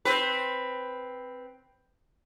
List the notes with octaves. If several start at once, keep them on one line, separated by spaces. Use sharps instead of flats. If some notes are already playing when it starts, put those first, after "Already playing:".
C4 B4